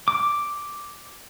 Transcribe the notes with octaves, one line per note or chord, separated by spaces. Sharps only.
D6